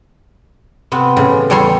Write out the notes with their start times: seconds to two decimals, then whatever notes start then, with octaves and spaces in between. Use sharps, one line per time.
0.92 C3 B3 C4
1.16 A2 C#3 E3
1.50 E2 G3 A4 C#5 A#5 C6